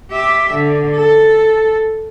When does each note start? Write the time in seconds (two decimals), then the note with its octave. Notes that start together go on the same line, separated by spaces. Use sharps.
0.12 G4 E5
0.53 D3
0.96 A4